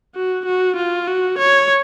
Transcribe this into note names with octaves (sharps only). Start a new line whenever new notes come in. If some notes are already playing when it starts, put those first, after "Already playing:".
F#4
F#4
F4
F#4
C#5